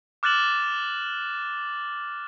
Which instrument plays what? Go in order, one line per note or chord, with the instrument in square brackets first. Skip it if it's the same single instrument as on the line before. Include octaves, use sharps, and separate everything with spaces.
[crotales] D6 F6 F#6 A6 E7 F#7